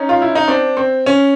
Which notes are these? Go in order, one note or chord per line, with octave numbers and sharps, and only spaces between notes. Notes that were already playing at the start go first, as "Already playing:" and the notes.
Already playing: C#4 D#4
F4
E4
D#4
C4 D4
C4
C#4